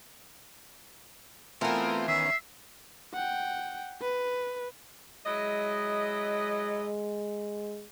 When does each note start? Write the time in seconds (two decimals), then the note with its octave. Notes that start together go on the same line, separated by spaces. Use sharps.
1.61 E3 A3 B3 C4 F4 A#4
2.08 D#3 C#4 E5 C7
3.14 F#5 G5
4.01 B4
5.26 F#3 G#3 E4 D#5